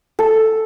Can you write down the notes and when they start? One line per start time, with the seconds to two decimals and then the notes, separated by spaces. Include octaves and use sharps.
0.19 A4